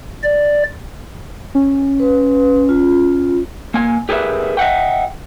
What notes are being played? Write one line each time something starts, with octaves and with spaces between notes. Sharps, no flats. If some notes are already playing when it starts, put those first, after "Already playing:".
D5
C#4
B4
F4
A#3 G#5
G4 G#4 A#4 B4 E5
D#5 E5 F#5 G5